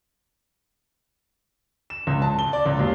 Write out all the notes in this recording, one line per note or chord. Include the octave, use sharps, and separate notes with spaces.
E7
C#2
A5
G7
D5
C#2
D#2